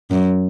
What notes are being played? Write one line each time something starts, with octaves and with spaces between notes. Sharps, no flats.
F#2